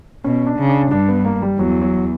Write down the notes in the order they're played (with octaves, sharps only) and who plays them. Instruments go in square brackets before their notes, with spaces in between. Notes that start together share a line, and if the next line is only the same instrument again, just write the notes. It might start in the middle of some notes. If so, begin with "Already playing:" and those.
[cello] B2 [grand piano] C#4
[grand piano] D4
[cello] C#3
[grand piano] D4
[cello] G2 [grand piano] D4
[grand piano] B3
A#3
G3
[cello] E2 [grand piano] F#3
[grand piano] F#3